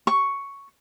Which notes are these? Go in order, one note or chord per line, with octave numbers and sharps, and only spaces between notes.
C#6